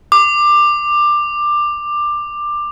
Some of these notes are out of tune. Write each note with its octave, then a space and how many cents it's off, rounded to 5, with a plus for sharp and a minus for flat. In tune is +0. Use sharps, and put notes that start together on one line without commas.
D6 +15